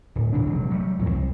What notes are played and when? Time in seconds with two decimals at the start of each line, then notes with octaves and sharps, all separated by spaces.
0.16 D1
0.33 D#1 A1 C#3 D4
0.46 E1 C3 F#3
0.71 F#3 G3 A3
0.98 A1 F2 A2
1.10 C2